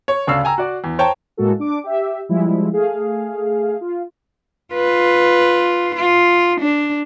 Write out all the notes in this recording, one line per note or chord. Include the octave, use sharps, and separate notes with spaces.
C#5
D2 C#3 D4 F5 E6
G5 G#5 A#5 E6
F#4 D5
E2
C5 C#5 G5 A5 A#5
A2 G#3 A#3 F#4 A4
D4 D6
G4 E5
F3 G3 G#3 E4
A3 G#4 F5
F4
F4 B4
F4
D4